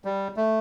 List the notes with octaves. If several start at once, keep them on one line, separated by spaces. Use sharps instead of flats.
G3
A3